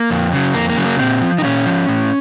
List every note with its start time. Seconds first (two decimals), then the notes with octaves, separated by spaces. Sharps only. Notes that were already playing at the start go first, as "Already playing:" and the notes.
Already playing: A#3
0.11 F2
0.33 C#3 F#3
0.54 F2 A#3
0.69 A#3
0.77 C#3 F#3
0.84 A#3
0.99 A#2 C4
1.22 F3
1.38 D#4
1.44 A#2 C#4
1.66 F3
1.88 A2